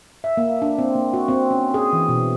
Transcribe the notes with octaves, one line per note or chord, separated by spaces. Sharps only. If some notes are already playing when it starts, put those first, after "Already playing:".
E5
A#3
D4
C4
A#3
F#4
C4
C#4
G#4
E3
B2